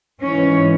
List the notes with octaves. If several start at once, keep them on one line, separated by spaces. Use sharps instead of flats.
G#2 E3 C#4